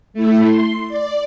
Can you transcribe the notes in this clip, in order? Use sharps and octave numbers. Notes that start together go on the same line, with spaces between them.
A3 E4
C6
D5